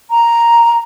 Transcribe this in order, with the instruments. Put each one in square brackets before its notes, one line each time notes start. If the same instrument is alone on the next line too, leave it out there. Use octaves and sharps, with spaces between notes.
[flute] A#5